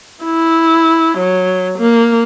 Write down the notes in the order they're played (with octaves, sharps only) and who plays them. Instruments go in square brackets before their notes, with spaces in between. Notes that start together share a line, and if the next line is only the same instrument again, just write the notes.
[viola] E4
F#3
A#3